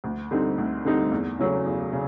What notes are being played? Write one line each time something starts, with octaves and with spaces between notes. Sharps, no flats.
D2
D3 G3 C4 D#4
D2
D3 G3 C4 D#4
E2
C#3 F#3 A3 C#4
E2
C#3